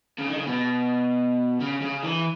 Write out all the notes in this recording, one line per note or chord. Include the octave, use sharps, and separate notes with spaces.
C#3
D#3
C#3
B2
C#3
C#3
E3